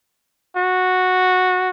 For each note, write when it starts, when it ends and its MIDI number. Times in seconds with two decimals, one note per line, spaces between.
0.57 1.70 66